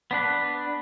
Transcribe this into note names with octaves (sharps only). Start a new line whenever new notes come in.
B3 D4 B4